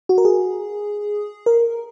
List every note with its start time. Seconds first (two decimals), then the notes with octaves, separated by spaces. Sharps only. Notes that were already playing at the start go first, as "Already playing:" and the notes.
0.09 F#4
0.18 A#4
0.25 G#4
1.46 A#4